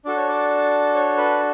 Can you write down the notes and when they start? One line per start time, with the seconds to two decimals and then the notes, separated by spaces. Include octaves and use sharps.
0.05 D4 F#4 A4 D5
0.17 C#5
0.28 D5
0.95 C#5
1.17 B4